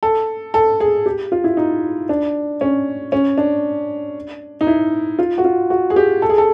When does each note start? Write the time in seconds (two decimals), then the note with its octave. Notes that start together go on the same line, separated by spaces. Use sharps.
0.03 A4
0.54 A4
0.80 G#4
1.06 G4
1.32 F4
1.44 E4
1.57 D#4
2.09 D4
2.61 C#4
3.12 C#4
3.38 D4
4.61 D#4
4.67 E4
5.19 F4
5.38 F#4
5.45 F4
5.70 F#4
5.90 G#4
5.96 G4
6.22 A4
6.30 G#4
6.38 A4